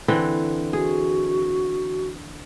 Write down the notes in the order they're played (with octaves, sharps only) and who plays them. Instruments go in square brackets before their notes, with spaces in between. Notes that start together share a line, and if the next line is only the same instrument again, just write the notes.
[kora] D3 E3 C4
[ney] F#4 [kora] G#4